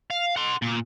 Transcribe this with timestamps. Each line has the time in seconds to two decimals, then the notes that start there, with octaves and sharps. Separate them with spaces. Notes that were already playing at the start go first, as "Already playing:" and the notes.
0.10 F5
0.36 F#5 C6
0.62 A#2